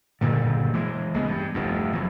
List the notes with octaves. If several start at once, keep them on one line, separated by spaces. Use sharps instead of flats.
F#1 G2 A#2 D3
E3 G#3
C#2 G#3 B3
G2
F1 E2 G2
E2 F#3